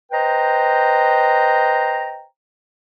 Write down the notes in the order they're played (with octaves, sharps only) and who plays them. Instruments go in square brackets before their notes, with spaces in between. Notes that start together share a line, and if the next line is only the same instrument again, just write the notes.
[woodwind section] B4 C5 D#5 G5 A#5